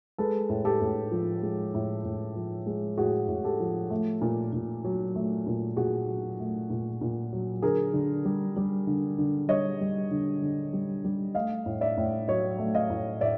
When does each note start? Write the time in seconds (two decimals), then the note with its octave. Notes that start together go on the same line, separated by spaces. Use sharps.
0.18 G#3 A4 B4
0.49 A2
0.65 G4 A4
0.81 A2
1.12 F3
1.42 G#3
1.74 A2
2.05 A2
2.36 F3
2.66 G#3
2.97 A2 F#4 G#4
3.28 A2
3.44 G4 A4
3.60 F3
3.90 A3
4.21 A#2
4.53 A#2
4.85 F#3
5.15 A3
5.47 A#2
5.76 A#2 F#4 G#4
6.08 F#3
6.40 A3
6.70 A#2
7.01 A#2
7.33 F#3
7.62 D3 G#4 A#4
7.94 D3
8.25 G3
8.56 G3
8.87 D3
9.18 D3
9.48 G3 C#5 D#5
9.81 G3
10.11 D3
10.42 D3
10.73 G3
11.05 G3
11.35 A3 D#5 F5
11.66 A2
11.81 D5 E5
11.97 A2
12.28 F#3 C#5 D#5
12.59 A3
12.75 D#5 F5
12.90 A2
13.21 A2 D5 E5